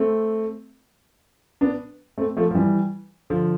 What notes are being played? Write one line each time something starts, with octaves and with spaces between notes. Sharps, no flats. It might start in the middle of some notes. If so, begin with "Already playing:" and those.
Already playing: A3 C4
B3 D4
A3 C4
F3 A3
F3
E3 G3
D3 F3